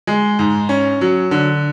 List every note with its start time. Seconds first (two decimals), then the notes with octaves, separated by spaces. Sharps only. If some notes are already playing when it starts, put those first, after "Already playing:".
0.07 G#3
0.39 G#2
0.69 C#4
1.01 F#3
1.31 D3